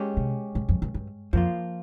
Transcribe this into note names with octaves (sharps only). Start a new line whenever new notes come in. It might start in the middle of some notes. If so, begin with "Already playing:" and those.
Already playing: G#3 C#4 G4
C3
G#2
F2
G2
G2
F2 F3 A#3 F4